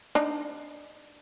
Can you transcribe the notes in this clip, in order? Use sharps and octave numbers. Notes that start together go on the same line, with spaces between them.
D4 D#4